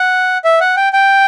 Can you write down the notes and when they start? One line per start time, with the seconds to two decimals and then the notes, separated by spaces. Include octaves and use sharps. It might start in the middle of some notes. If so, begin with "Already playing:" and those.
Already playing: F#5
0.44 E5
0.61 F#5
0.76 G5
0.93 G5